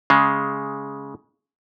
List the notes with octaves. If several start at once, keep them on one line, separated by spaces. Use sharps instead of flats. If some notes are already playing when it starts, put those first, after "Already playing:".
C#3 G#3